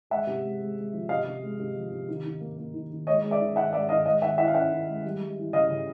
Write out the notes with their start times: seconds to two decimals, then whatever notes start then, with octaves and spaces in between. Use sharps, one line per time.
0.10 G#3 E5 F#5
0.27 C3
0.44 G#3
0.60 G#3
0.77 G#3
0.94 F3
1.09 C3 D#5 F5
1.26 C3
1.43 G#3
1.60 C3
1.76 F3
1.92 C3
2.09 D#3
2.25 D#3
2.41 A#3
2.58 A#3
2.74 D#3
2.91 D#3
3.07 G#3 C#5 D#5
3.24 G#3
3.31 D5 E5
3.40 D#3
3.56 D#3 E5 F#5
3.73 G#3 D5 E5
3.89 D#3 D#5 F5
4.06 G#3 D#5 F5
4.22 D#3 E5 F#5
4.38 E4 E5 F#5
4.48 F5
4.54 C#4 E5 F#5
4.71 D#3
4.88 G#3
5.05 G3
5.21 G3
5.37 E3
5.53 C#3 D#5 F5
5.70 C#3